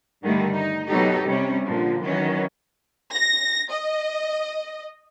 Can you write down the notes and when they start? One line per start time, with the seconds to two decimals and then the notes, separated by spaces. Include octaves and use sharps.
0.23 G2 D3 D#3 G3 A3
0.55 D#4
0.86 B2 F#3 D#4 G4 A4
1.26 C3 G3 C#4
1.65 A#2 D3 F3
2.03 D#3 E3 F#3 C#4
3.13 A#6
3.72 D#5